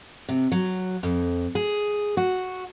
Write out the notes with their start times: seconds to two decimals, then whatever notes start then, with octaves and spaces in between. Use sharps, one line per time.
0.29 C3
0.52 F#3
1.03 F2
1.55 G#4
2.17 F#4